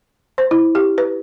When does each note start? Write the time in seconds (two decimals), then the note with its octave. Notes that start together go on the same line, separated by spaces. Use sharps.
0.38 C5
0.51 E4
0.75 G4
0.98 B4